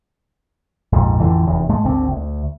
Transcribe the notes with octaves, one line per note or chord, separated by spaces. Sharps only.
A#1 F2 G#2
A1 F2 D3 E3
F1 E2
G#2 G#3 A3
G#1 D2 D3 C4
D2